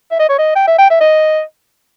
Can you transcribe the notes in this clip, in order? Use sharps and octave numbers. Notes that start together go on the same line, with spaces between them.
E5
D#5
C#5
D#5
G5
E5
G5
E5
D#5